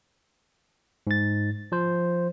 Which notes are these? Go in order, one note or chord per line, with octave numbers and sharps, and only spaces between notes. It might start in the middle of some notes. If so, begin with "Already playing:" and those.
G#2 A6
F3 C5